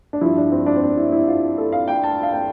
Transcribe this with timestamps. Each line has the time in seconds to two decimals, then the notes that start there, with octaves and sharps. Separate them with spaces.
0.13 D4
0.21 G2 F3 E4
0.37 D4
0.52 C4
0.66 D4
0.76 C4
0.82 D4
0.97 E4
1.12 E4
1.28 F4
1.58 A4
1.72 F5
1.88 G5
2.04 A5
2.23 F5
2.33 G5